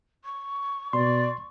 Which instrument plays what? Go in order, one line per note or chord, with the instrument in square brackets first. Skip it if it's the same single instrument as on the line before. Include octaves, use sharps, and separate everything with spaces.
[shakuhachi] C#6
[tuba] B2 [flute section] D5 [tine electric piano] C6